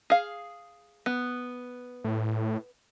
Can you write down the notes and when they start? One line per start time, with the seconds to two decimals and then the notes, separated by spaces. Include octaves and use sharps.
0.10 G#4 F5
1.06 B3
2.04 A2